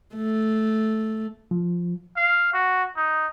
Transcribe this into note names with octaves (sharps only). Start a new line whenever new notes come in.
A3
F3
F5
F#4
D#4